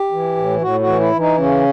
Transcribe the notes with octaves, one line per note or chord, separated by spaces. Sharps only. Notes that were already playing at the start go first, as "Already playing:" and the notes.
Already playing: G4
E3
A2
A2 F#4
F#4
E3
E4
E3
D#4
C#3 C#4